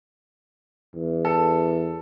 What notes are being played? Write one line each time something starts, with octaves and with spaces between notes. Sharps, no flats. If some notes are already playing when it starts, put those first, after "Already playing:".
E2
A4